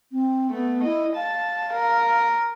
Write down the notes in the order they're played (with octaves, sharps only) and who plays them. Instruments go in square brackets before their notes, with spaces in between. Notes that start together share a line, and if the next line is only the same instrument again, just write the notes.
[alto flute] C4
[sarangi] A3 [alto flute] B3
[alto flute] E4 [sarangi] D#5
[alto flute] F5 [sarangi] A5
[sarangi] A#4